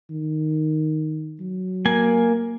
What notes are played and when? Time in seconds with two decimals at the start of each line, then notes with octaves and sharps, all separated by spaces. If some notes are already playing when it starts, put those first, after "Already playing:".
0.10 D#3
1.40 F#3
1.86 A#3 G#5